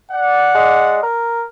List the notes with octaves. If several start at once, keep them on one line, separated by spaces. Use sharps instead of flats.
D5 F#5
G#3
A#4